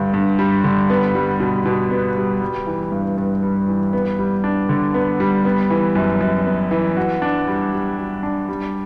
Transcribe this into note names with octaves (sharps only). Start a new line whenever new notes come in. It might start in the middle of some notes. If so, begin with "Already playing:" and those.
Already playing: G2 D3 G3
G2
G3
D3
B3
G3
B2
B2
B3
G3
G3
E3
G2
G2
G3
E3
B3
G3
D4
D3
B3
G3
B3
E3
F#2
F#2
B3
E3
F#4
D4
G3
G3
F#4
D4
G3